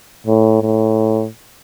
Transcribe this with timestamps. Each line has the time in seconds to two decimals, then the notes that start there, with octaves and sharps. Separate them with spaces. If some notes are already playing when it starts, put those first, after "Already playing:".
0.27 A2
0.62 A2